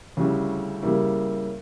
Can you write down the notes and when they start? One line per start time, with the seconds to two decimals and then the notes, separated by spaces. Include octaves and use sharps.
0.17 D2 C#3 G3 C#4 E4
0.83 C#3 G3 A#3 E4